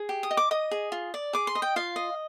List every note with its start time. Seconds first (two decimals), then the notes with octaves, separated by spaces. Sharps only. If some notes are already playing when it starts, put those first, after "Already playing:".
Already playing: G#4
0.09 G4
0.23 D#6
0.31 D#5
0.37 D6
0.51 D#5 D#6
0.71 G#4
0.92 F4
1.14 D5
1.33 G#4 D6
1.47 C6
1.55 D#5
1.62 G5
1.76 F4 F5
1.96 D#5